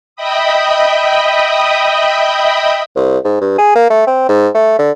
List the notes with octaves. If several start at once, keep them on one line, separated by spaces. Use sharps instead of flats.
D#5 E5 G5 B5 D#6
C2
G#2
G2
G#4
A#3
A3
C4
G#2
A3
D3